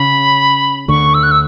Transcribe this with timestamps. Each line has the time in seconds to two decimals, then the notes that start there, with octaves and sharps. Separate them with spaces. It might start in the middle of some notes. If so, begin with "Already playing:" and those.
Already playing: C#3 C#4 B5
0.88 D2 D3 C#6
1.14 E6
1.23 F#6
1.31 E6